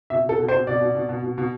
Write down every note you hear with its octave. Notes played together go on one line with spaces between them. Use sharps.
B2 E5
B2 A4
B2
C5
B2
B2 D5
B2
B2
B2
B2
B2